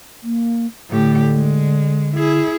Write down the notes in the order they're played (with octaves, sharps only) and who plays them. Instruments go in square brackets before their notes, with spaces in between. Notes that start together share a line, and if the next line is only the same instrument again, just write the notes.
[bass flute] A#3
[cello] A2 G4 [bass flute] D3
[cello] G#3
E4 G#4